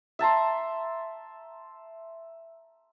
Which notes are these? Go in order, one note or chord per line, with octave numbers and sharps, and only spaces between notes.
E5 A5 A#5 C6